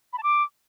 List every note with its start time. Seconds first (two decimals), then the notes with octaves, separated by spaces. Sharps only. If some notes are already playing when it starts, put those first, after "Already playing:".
0.13 B5
0.18 A5
0.23 D6